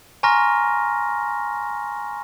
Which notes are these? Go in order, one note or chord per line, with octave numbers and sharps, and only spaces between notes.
G#5 A#5 C6 C#6 F6 A#6